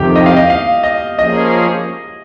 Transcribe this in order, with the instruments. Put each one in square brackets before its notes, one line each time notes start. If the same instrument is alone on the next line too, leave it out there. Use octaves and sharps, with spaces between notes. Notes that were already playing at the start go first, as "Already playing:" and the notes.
Already playing: [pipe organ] F2 C3 D#3 [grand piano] G4 G5
[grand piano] D#5
F5
D#5
F5
D#5
[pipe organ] F3 A#3 C#4 G#4 [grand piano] D#5